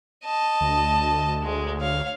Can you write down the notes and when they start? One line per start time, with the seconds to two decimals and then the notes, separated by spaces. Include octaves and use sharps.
0.24 D#5 A5
0.61 D2
1.43 G#3
1.80 C#5 F5